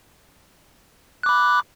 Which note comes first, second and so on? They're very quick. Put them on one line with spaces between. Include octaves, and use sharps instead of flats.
F#6 D6 B5